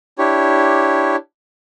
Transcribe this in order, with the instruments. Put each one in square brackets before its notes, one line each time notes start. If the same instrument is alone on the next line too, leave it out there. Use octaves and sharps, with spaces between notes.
[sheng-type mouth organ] D4 E4 G4 C#5